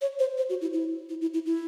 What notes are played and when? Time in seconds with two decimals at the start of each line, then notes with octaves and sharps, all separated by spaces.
0.01 C#5
0.19 C5
0.38 C5
0.49 F#4
0.61 E4
0.73 E4
1.09 E4
1.21 E4
1.34 E4
1.46 E4